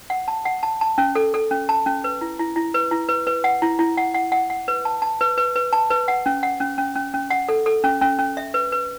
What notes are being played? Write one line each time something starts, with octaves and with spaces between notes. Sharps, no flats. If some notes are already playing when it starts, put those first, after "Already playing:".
F#5
A5
F#5
A5
A5
C#4
A4
A4
C#4
A5
C#4
B4
E4
E4
E4
B4
E4
B4
B4
F#5
E4
E4
F#5
F#5
F#5
F#5
B4
A5
A5
B4
B4
B4
A5
B4
F#5
C#4
F#5
C#4
C#4
C#4
C#4
F#5
A4
A4
C#4
C#4
C#4
E5
B4
B4